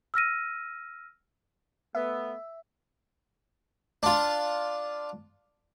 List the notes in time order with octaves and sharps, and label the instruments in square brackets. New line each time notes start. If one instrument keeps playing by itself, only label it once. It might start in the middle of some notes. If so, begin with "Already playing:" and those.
[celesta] E6 F6 A#6 D#7
[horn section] A3 B3 [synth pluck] E5
[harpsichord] D4 F4